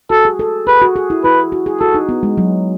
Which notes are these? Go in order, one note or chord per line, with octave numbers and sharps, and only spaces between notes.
F#4 A4
G#4
A4
G#4 B4
F#4
G#4
E4
E4 B4
F#4
G#4
F#4 A4
D#4
B3
G#3
F#3